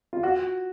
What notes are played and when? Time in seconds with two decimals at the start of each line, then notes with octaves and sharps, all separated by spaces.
0.13 F4
0.23 F#4